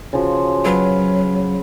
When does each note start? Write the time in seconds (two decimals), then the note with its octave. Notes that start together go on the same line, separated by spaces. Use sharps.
0.13 C#3 F3 F#4
0.65 F#3 B4 F5 F#5